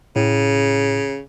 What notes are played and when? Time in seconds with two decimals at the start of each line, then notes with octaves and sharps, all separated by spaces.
0.16 A2 C#3